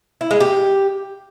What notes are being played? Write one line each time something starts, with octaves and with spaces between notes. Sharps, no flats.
E4
G#3
G4